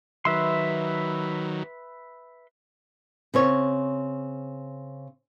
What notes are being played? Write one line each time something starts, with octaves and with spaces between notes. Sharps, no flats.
D#3 F#3 B4 E5 C6
C#3 C4 C#5